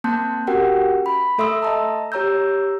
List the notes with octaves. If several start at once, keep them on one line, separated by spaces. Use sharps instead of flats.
A#3 C4 A5 C6 F#6 G6
C#4 F#4 G4 A#4 F#5 G5
B5
A3 A4 E5 C6 D#6 E6
D#5 A5 A#5
G4 C#5 A#5 E6 G6